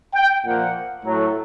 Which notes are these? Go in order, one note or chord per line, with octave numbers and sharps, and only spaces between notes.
G5
A#2 F3 A#3 F#5
A2 F#3 A3